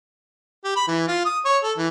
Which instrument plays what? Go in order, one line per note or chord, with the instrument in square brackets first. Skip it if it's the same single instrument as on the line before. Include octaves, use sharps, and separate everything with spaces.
[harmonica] G4
B5
E3
F4
D#6
C#5
A4
E3